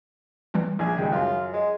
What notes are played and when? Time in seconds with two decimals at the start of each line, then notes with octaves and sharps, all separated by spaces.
0.54 E3 G3 C4
0.79 A#1 G#4
0.98 C#2 D#3 G4
1.13 F#2 F4
1.53 G#3